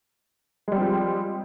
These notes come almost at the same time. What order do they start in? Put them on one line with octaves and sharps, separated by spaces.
G#3 G3 C4 F3